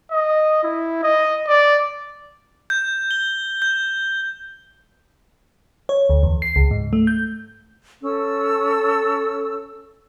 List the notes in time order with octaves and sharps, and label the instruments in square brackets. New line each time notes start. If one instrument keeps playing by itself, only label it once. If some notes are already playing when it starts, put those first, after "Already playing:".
[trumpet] D#5
E4
D#5
D5
[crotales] G6
G7
G6
[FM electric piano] C#5
D2
E2
C7
C#2
G#2
A3
G6
[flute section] C#4 A4 E6